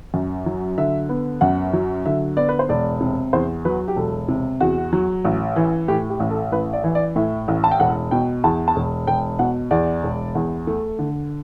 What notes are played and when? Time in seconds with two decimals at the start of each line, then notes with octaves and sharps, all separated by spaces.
0.14 F#2
0.46 F#3
0.78 D3 E5
1.09 B3
1.41 F#2 F#5
1.73 F#3
2.06 D3 E5
2.37 B3 D5
2.49 B4
2.59 C5
2.69 E1 D5
3.00 C3
3.33 E2 C5
3.65 F#3 B4
3.88 G4
3.96 E1 A4
4.28 C3
4.60 E2 F#4
4.93 F#3
5.25 A1
5.56 E3
5.88 A2 G4
6.10 G4
6.20 A1
6.31 A4
6.52 A1 B4
6.73 D5
6.84 E3
6.95 D5
7.16 A2 E5
7.48 A1
7.64 A5
7.71 G5
7.80 E1 F#5
8.11 B2 G5
8.44 E2 A5
8.68 A5
8.76 E1
9.07 E1 G5
9.39 B2 F#5
9.71 E2 D5
10.03 E1
10.35 E2
10.67 A3
10.99 D3